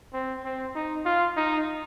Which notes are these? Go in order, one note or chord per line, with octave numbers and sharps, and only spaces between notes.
C4
C4
D#4
F4
D#4